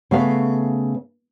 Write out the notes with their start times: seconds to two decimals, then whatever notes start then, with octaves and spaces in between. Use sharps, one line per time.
0.11 C#3 A3 B3 E5 F5